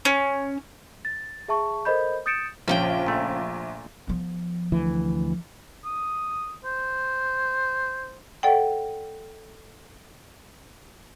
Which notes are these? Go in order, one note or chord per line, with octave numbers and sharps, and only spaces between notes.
C#4
A6
G#4 E5 A5 C#6
A4 A#4 C5 D#5 B5 G6
D#6 G6 A6 C#7 D7 E7
A#1 C#3 F3 G5
A#2 A3
F3 B3
D2 E3
D#6
C5
A4 D5 F#5 G5